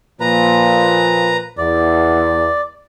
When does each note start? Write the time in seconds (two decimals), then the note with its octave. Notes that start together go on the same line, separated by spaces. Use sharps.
0.21 A#2 F3 B4 A#5
1.58 E2 D5